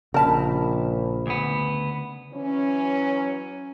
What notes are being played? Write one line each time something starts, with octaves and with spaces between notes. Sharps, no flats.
A#1 C#3 A#4 A5 B5
D2 B3
E3 F#3 C#4